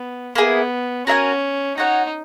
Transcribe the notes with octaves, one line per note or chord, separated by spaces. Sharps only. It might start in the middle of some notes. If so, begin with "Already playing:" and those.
Already playing: B3
A#3 B3 E4 G#4
C#4 F#4 A#4 E5 G#5
D#4 F#4 C#5 F#5